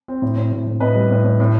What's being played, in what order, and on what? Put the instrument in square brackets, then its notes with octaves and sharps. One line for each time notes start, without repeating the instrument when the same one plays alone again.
[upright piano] C4
A2
A2
A2
A2
A2 B4 D#5
G3
A2
A2
A2